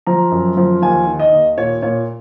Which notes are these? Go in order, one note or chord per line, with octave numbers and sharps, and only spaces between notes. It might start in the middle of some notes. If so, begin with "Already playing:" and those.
F3 A#5
F#2
F3
D#2 G#5
D#3
D#5
D#2
A#2 C#5
A#2 C#5